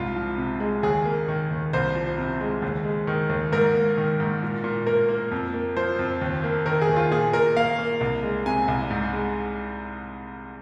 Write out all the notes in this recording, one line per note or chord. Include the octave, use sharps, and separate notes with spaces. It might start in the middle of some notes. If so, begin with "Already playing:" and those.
Already playing: C2 G#2 F4
F3
C3
G#3
D#2 G#4
A#3
D#3
D#2
C2 C5
F3
C3
G#3
D#2
G#3
D#3
D#2
G#2 A#4
A#3
D#3
G#2
A#2
A#2
A#3 A#4
A#3
F2
A#3
F3 C5
F2
D#2
A#3
D#3 A#4
G#4
D#2
F4
A#2 G#4
A#2 A#4
A#3 F5
A#3
C2
G#3
C3 G#5
C2
G#2
G#3